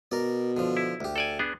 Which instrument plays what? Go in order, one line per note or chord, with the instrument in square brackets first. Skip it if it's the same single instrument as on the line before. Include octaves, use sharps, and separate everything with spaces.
[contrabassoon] B2 [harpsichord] A#4 D5
[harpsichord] D3 F3
[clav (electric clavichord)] E4
[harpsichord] D2 G4
[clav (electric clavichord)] A4 D5 G#5
B3 D4 G#4